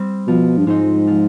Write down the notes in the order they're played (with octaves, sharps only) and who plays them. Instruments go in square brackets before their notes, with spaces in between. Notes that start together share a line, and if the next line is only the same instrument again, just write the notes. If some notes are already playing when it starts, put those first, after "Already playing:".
Already playing: [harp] G3 C4
[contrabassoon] B2 [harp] F3
[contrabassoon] G2
[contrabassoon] G#2 [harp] G#3 C4 D#4
[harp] F3